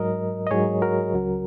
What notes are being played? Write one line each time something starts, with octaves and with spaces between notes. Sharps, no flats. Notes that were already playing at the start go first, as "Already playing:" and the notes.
Already playing: G#2 F#3 A#4 D#5
D#5
G#2 F#3 G#4 C#5
F#4 A#4
C#2 C#3 F#3